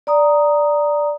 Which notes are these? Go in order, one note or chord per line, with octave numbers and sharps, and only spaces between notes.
D5 A#5 D#6